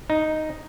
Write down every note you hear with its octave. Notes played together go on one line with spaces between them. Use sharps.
D#4